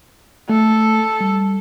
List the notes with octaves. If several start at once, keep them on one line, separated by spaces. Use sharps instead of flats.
A3 A4
G3